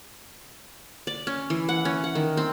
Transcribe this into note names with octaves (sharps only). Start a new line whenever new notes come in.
D5
C#4
E3
F#5
C#4
F#5
D#3
C4